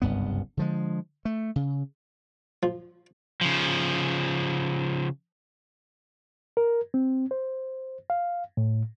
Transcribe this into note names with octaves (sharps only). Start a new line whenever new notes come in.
F#1 C2 G2 B3
D3 F3 G#3
A3
C#3
F3
C#3 F3
A#4
C4
C5
F5
A2